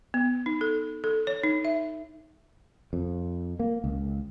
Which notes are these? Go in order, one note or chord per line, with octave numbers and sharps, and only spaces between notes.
B3
D#4
A4
A4
C#5
D#4
E5
F2
A#3
C#2